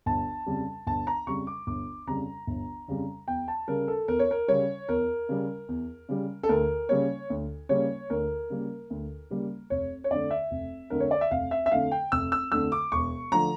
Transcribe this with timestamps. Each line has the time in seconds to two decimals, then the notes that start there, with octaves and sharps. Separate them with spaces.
0.06 G1 A5
0.46 F2 C#3 G3
0.87 G1 A5
1.07 A#5
1.27 F2 C#3 G3 C#6
1.47 D6
1.67 G1 D6
2.07 F2 C#3 G3 A#5
2.47 G1
2.88 F2 C#3 G3
3.28 E2 G5
3.48 A5
3.68 C#3 G3 A#4
3.88 A4
4.08 E2 A#4
4.19 C#5
4.31 A#4
4.48 C#3 G3 C#5
4.89 E2 A#4
5.29 C#3 G3
5.69 E2
6.09 C#3 G3
6.43 A4
6.49 D2 A#4
6.89 C#3 G3 A#3 C#5
7.30 D2
7.69 C#3 G3 A#3 C#5
8.10 D2 A#4
8.50 C#3 G3 A#3
8.90 D2
9.30 C#3 G3 A#3
9.70 F1 C#5
10.04 C#5
10.11 F2 D3 A3 D5
10.31 E5
10.51 F1
10.90 F2 D3 A3 A#4
11.00 C#5
11.11 D5
11.21 E5
11.31 F1 F5
11.51 E5
11.66 E5
11.72 F2 D3 A3 F5
11.92 G5
12.12 F1 E6
12.32 E6
12.52 F2 D3 A3 E6
12.72 D6
12.92 E1 C#6
13.32 D3 F3 A3 A#5